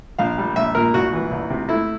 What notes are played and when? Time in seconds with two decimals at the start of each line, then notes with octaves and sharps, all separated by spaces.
0.19 A#1 F5
0.38 G3
0.56 A#1 E5
0.75 A#2 A#4
0.94 C2 F#4
1.13 E3
1.31 C2
1.50 C3
1.69 A3 E4